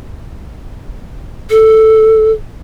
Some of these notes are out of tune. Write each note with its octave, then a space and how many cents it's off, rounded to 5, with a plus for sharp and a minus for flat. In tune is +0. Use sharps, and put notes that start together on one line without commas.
A4 +0